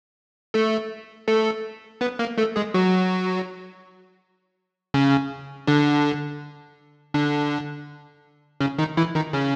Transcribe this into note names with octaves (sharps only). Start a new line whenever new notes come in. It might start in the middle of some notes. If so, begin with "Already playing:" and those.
A3 A4
A3 A4
B3 B4
A#3 A#4
A3 A4
G#3 G#4
F#3 F#4
C#3 C#4
D3 D4
D3 D4
C#3 C#4
D#3 D#4
E3 E4
D#3 D#4
C#3 C#4